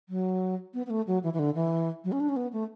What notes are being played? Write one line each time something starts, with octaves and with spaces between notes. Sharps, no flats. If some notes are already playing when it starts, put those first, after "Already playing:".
F#3
B3
B3
A3
F#3
E3
E3
D3
E3
F#3
C#4
D4
C#4
B3
A3